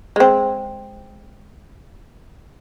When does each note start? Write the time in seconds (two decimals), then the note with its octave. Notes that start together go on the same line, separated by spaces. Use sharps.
0.16 G#3 C4